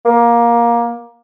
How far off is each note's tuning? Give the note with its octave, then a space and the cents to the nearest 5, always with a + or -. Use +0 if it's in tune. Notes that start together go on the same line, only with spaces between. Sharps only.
A#3 +15